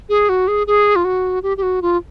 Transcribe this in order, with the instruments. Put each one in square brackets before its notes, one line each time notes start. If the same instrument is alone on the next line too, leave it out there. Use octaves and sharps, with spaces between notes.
[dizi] G#4
F#4
G#4
G#4
F4
F#4
G4
G4
F#4
F4